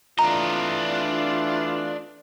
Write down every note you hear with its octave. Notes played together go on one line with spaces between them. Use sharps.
E3 A3 D4 F4 D#5 A#5